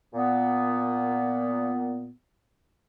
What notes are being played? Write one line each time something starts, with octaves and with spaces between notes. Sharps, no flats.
A#2 B3